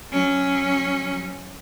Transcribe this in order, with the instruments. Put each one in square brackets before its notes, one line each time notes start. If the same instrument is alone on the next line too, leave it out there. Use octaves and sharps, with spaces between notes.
[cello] F#3 C#4